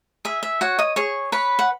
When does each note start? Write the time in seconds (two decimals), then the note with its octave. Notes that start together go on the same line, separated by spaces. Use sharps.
0.25 G#4 E5
0.43 E5
0.61 F#4 C#5 F#5
0.79 D#5 D#6
0.96 G#4 C#5 C#6
1.32 B4 C#5 B5
1.59 F#5